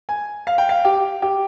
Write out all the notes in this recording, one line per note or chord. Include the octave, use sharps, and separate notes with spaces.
G#5
F5
G5
F5
G4
G4